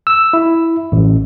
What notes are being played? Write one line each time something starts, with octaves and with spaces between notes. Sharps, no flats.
E6
E4
A1